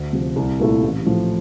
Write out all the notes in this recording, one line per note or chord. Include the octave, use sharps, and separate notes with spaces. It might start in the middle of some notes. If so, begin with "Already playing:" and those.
Already playing: D2
C3 F3
C2
A#2 A3 E4
A1
A2 F3